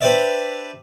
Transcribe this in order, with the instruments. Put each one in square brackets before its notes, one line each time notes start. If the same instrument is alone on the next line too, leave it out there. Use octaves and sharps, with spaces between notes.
[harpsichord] D4 G4 B4 C5 D5 E5